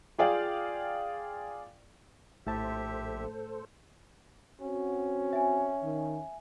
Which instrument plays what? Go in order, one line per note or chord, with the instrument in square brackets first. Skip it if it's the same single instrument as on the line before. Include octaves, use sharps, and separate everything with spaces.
[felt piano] F4 G#4 D5 F5 G5
[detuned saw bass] A#1 [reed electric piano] A2 A3 A5 [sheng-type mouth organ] G4 E5 [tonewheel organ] A4 C5
[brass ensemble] C4 F#4 [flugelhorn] C#4
[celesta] E5 G#5
[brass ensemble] D#3